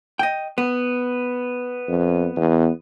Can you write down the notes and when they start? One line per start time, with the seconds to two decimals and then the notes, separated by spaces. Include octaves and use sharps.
0.19 D#5 G5
0.58 B3
1.89 F2
2.36 E2